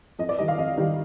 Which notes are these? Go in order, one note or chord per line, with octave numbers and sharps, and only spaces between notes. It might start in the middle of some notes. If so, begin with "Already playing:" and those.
F2 D#5
D5
D#3 G3 D#5
F5
F2 D#5
D#3 G3